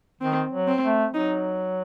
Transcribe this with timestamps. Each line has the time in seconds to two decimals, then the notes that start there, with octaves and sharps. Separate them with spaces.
0.21 D#3 C4
0.52 F#3
0.68 C4
0.83 A3
1.14 F#3 D#4